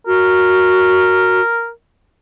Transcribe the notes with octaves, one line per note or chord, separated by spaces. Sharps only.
F#4 A#4